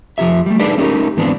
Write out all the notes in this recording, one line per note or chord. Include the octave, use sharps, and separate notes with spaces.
F2 F3 F4 G4 E5
G3 A3
D4 D#4 G#4 A4 B4 D5
A3 C#4 D#4 G4 A#4
G#2 E3 B3 C4 D4